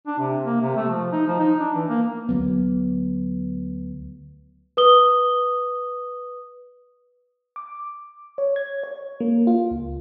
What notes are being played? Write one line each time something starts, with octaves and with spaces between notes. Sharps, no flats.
D4
C3
A#3
C3
A3
F3
D#4
F3
D#4
D4
E3
A#3
D2 F#3 B3
B4 D#6 G7
D6
C#5
G#6
C#5
A#3
F4
C#2